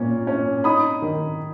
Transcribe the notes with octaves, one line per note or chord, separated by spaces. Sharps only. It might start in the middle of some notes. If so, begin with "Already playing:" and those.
Already playing: A#2 C#4
C#4
D#4 B5 D#6
D#3